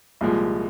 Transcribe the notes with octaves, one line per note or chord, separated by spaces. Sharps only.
C2 A#2 F3 G#3